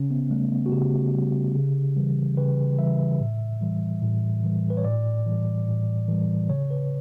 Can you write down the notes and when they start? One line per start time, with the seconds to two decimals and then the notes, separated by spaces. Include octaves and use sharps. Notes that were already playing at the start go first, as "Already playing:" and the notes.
Already playing: C#3 C#4
0.11 B3
0.31 G3 A3
0.52 B3
0.66 F#4
0.72 C#3 G4
1.14 G3
1.55 C#3
1.96 E3 G3
2.37 C#3 B4
2.79 E3 G3 E5
3.20 A2
3.61 E3 G3
4.02 A2
4.43 E3 G3
4.70 B4
4.77 C#5
4.84 A2 D5
5.26 E3 G3
5.68 A2
6.08 E3 G3
6.49 C#3 C#5
6.70 B4